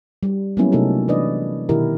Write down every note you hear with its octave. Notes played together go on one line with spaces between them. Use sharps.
G3
F#3 G3 A#3 B3 C#4 E4
C3 A3 D#4 F#4 A4 A#4
E3 D4 B4 D5 D#5
B2 D#3 E4 G4 A#4